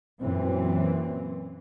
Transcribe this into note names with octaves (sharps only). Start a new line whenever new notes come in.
F#2 A#2 E3 C4